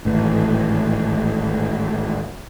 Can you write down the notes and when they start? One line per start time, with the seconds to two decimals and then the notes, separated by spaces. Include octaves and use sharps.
0.05 G#1 A2 E3